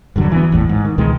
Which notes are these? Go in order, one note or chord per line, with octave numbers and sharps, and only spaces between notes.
E1 G2 D3 F#3
E3 B3
G#1 E2 A2
G#2
D#3
C#2 B2 D#3 G#3